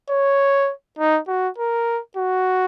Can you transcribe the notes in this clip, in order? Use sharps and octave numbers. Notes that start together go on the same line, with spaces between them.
C#5
D#4
F#4
A#4
F#4